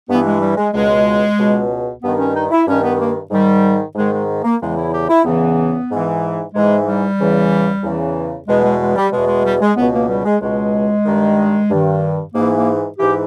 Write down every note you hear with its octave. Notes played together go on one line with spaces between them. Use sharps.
G2 E3 B3
G#3
G3
G#3
C#2 B2 G#3
C#2 B2
G2 D#3 B3
C#4
D#4
E4
G2 D#3 C#4
B3
A#3
G#2 D#3 G3
G#2 D#3 G#3
G#3
A#3
E2 C#3 E3 G#3
E4
G4
E4
E2 C#3 E3 B3
G#2 E3
G#2 E3 G#3
G3
E2 C#3 E3
E2 C#3 E3
E2 B2 G#3
G#3
G#3
G3
E2 B2 G#3
G#3
G3
G#3
C#2 B2 B3
A#3
G3
G#3
C#2 B2 G#3
G2 D#3
G2 D#3
G#2 E3 A#3
A#3
G#2 E3 G4